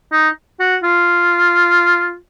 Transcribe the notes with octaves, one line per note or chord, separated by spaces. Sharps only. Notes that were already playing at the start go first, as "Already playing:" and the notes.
D#4
F#4
F4